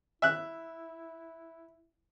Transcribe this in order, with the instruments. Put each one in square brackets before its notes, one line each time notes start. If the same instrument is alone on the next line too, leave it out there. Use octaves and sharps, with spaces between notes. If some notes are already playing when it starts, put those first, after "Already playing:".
[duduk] E4 [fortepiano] E5 F#6